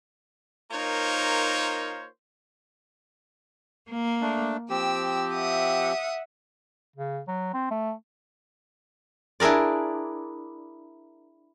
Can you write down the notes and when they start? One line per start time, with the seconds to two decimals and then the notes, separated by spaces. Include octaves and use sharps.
0.70 A#3 D#4 F4 A#4 C5 C#5
3.89 A#3
4.21 A3 D4
4.70 F3 C4 G4 G5 E6
5.34 E5 F#5 D#6
6.96 C#3
7.28 F#3
7.54 C4
7.71 A3
9.40 D4 E4 G#4 A#4 D5